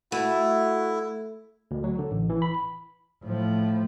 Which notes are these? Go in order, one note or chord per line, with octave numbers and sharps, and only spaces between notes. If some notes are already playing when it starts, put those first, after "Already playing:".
A3 E4 F#4
D2
F#3
D3
A1
E3
B5
A2 F3